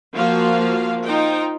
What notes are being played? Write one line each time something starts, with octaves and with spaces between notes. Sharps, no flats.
F3 A#3 F4 F#4 F5
D#4 F4 C5 G5